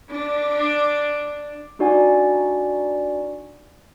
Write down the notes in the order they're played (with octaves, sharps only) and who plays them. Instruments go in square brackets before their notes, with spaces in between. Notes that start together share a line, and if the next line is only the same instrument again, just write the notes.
[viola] D4
[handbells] D4 D#4 F#4 D5 F#5 G#5